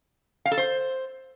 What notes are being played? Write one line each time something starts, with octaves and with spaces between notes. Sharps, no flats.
F5
A4
C5